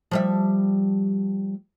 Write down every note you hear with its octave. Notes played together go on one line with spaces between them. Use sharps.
F3 G3 E5